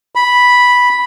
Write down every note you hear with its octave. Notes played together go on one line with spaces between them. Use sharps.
B5